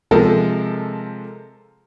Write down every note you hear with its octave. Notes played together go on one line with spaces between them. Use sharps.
C3 F3 G#3 A4 A#4